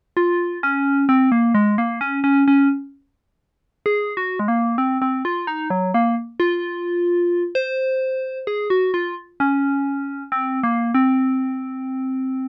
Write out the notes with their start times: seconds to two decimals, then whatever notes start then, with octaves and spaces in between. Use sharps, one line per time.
0.17 F4
0.63 C#4
1.09 C4
1.32 A#3
1.55 G#3
1.78 A#3
2.01 C#4
2.24 C#4
2.48 C#4
3.86 G#4
4.17 F#4
4.39 G#3
4.48 A#3
4.78 C4
5.02 C4
5.25 F4
5.47 D#4
5.70 F#3
5.94 A#3
6.40 F4
7.55 C5
8.47 G#4
8.70 F#4
8.94 F4
9.40 C#4
10.32 C4
10.63 A#3
10.95 C4